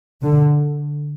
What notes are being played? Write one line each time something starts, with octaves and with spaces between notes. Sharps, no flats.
D3